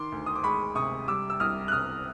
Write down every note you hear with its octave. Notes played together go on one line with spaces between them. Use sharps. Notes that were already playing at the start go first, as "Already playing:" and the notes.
Already playing: D#3 C6 D6
D2
D#6
D6
G#3 B5 C#6
C3 C#6 D#6
G3 D6 E6
E6
C2 D#6 F6
F#6
C2 D#6 F6